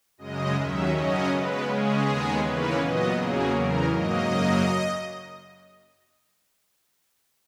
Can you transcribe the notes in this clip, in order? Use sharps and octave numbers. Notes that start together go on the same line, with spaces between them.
F#2 C#3 G#3 D#5
D#2 D#3 F#3 C#4 E5
F#2 C#3 F#3 C#4 D#5
C#3 G#3 B3 B4
C#3 G#3 C#4 G#4
D#2 D#3 G#3 B3
C#3 E3 A#3 C#4 B4
A#2 F#3 B3 D#5
E2 C#3 F#3 A#3 G#4
E2 C#3 E3 A#4
G#2 F#3 A#3 D#5
F#2 C#3 F#3 A#3